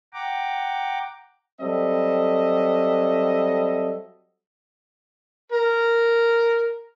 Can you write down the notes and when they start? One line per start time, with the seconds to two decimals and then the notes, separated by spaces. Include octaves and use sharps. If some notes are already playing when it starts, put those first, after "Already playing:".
0.13 F#5 G5 A#5 D6
1.60 F#3 G3 C4 A4 D#5 E5
5.52 A#4